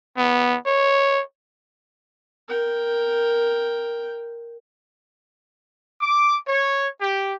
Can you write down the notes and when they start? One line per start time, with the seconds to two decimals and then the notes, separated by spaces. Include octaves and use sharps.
0.17 B3
0.66 C#5
2.48 A#4 G5
6.01 D6
6.48 C#5
7.02 G4